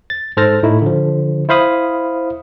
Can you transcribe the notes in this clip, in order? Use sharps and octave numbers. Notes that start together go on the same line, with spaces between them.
A6
G#2 A4 C5 F6 A6 A#6
A2 A3 D#4 E4
D3 F3
E4 C5 F5 B5 D#6